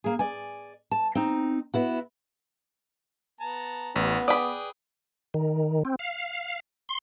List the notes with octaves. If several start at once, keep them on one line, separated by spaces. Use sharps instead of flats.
A#3 G#4
D5 G#5
A5
C4 D#4
B3 E4 F#4
B3 A5 A#5
A1 B3
G#4 B4 D5 G5 B5 D#6
D#3
C4
F5
C6